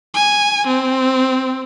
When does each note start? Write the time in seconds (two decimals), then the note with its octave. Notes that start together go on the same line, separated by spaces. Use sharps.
0.14 G#5
0.67 C4